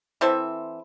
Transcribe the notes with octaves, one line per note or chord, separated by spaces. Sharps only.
E3 C4 A4 E5